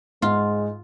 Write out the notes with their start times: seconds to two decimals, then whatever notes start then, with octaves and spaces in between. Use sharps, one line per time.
0.22 G#2 G#3 F4